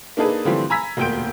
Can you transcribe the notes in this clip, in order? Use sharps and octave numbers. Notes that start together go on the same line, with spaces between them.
A#3 D4 D#4 G#4 A4 B4
D3 E3 F3 G3 A3 C4
G#5 A#5 B5 E6 G#6 B6
E1 D2 A#2 G5 G6 D7